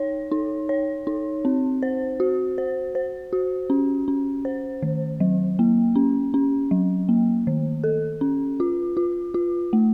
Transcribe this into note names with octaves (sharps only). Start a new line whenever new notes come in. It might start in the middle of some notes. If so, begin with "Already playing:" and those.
Already playing: D#4 C#5
D#4
C#5
D#4
C4
C5
F#4
C5
C5
F#4
C#4
C#4
C5
D#3
F#3
A#3
C#4
C#4
F#3
A#3
D#3
A4
C#4
F4
F4
F4
A3